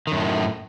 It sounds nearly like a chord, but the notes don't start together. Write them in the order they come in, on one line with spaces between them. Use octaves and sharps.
D#3 F#2 A2